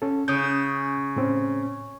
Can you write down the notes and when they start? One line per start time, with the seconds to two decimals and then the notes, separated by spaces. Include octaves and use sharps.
0.02 C#4 A4
0.28 C#3 D#6 G6
1.16 A2 C4 C#4